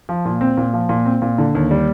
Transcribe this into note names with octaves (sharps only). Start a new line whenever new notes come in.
F3
A#2
C4
A#2
F3
A#2
C4
A#2
D3
D#2
G3